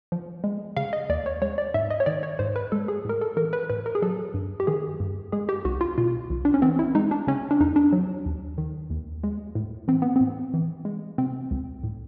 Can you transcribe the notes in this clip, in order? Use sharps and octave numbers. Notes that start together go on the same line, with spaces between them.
F3
G#3
C#3 F5
D#5
D#2 D5
C#5
G#3 C#5
D5
G#2 E5
D#5
C#5
D#3 D5
C#5
G#2 C5
B4
G#3 A4
G#4
A2 A#4
A4
E3 A#4
B4
A2 B4
A#4
G#4
F#3 A4
G2
G4
D#3 G#4
G2
G#3 G#4
G4
C2 F#4
F4
B2 F4
C2
D4
C#4
E3 C4
E4
G#3 D#4
D4
C#3 C#4
D4
F2 D#4
D4
F#3
D#2
D#3
D#2
G#3
A2
E3 C4
B3
A2 C4
E3
G#3
C3 C4
C#2
A2